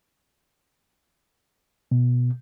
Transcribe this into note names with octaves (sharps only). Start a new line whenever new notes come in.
B2